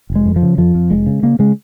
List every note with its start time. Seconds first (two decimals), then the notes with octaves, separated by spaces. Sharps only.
0.10 F1
0.15 G#3
0.26 F2
0.36 F3
0.42 C#3
0.58 F2 F3
0.75 F2
0.90 F1 G#3
1.06 C#3
1.23 C#3 A#3
1.39 C#3 G#3